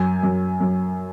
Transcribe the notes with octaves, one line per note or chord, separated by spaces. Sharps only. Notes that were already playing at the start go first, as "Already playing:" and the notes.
Already playing: F#2 G#5
F#2
F#2